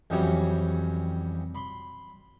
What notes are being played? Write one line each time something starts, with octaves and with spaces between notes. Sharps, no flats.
F2 E3 F#3 G3 C#4
B5 C6